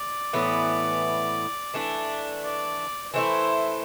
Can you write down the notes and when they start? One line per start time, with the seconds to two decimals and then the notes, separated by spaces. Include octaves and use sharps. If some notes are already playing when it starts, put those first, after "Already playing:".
Already playing: D5
0.33 A2 E3 B3
1.74 E3 A3 D4
2.43 D5
3.13 E3 A3 E4 C5